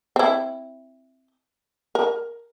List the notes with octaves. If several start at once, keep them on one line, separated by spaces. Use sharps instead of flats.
C4 E4
A#4